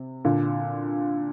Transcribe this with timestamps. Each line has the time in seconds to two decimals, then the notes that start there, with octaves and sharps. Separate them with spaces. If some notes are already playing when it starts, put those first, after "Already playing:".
Already playing: C3
0.25 A#2 D3